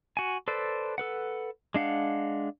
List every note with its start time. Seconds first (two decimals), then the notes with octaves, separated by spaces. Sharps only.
0.17 F#4 G#5
0.48 A4 B4 C5 D5
0.98 A4 B4 F#5
1.74 G#3 D4 F5 F#5